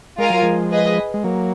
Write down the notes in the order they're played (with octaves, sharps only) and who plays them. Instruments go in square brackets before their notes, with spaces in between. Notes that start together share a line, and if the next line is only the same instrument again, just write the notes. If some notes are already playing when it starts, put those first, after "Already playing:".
[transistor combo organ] G#3 [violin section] F4 A#4 F5 G#5
[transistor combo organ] F#3
F3 G#3
[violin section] G#4 B4 D#5
[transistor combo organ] G#3
F#3 A#3